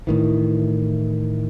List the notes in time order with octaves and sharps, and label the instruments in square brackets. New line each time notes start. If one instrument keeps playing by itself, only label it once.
[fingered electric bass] A2 D#3 E3